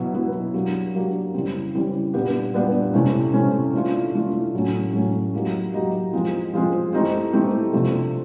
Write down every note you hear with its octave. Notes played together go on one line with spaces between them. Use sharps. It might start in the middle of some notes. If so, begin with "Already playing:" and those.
Already playing: B2 F#3 B3 E4
B2 F#3 B3 E4
F#3 A#3 D4 G4
F#3 A#3 D4 G4
C#3 E3 G3 C4
C#3 E3 G3 C4
A#2 G3 B3 D4 G4
A#2 G3 B3 D4 G4
C3 E3 A3 C#4
C3 E3 A3 C#4
E3 A3 D4 F4
E3 A3 D4 F4
A2 F#3 A3 C#4
A2 F#3 A3 C#4
F#3 A#3 D#4 G4
F#3 A#3 D#4 G4
F3 G#3 C4
F3 G#3 C4
E3 A3 C4 D#4 G4
E3 A3 C4 D#4 G4
C3 F3 A3 D4